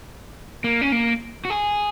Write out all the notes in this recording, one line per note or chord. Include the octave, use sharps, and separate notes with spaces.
A#3
C#4
A#3
F#4
G#4